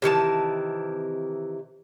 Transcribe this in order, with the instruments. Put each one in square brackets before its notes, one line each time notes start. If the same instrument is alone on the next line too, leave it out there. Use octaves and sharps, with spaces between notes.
[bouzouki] C3 D#3 E3 A5